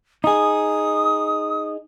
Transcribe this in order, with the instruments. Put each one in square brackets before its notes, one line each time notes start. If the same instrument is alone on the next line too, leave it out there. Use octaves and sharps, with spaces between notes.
[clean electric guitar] D#4 G#4 [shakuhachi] D#6